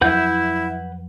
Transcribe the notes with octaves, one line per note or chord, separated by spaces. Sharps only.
F2 F#3 E4 B4 F#5 G6